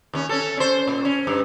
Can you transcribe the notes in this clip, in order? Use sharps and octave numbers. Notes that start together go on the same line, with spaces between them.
D#2 C#4
C#4 A4
C#4 C5
A#2
C#4
G2